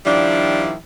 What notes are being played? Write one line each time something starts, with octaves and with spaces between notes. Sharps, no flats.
D#3 F3 G3 D4 E4